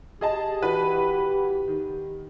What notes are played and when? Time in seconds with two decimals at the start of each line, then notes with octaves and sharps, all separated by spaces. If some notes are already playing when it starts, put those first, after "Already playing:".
0.21 G4 G#4 D#5 A5
0.62 E3 F#4 B4
1.68 D#3